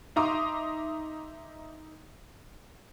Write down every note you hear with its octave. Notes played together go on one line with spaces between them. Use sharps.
D#4 E5 A#5 C6 D6 D#6